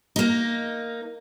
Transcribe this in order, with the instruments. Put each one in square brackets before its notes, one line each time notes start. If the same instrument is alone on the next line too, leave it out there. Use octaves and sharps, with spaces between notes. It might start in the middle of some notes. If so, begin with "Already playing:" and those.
[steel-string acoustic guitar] A#3 D#4